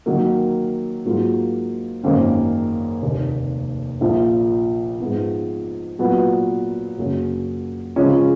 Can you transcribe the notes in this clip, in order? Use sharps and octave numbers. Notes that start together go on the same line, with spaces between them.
D#3 F#3 A#3
G#2 F#3 A#3 F4
G#1 F#2 D#3 A#3
F1 D#2 D#3 A#3
A#1 A#2 F3
G#2 F3 B3
A#2 F#3 B3
F#2 C#3 F#3 A#3 C#4
C#3 F3 G#3 C#4